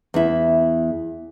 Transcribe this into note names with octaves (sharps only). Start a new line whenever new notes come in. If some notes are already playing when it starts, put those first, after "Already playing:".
E2 E4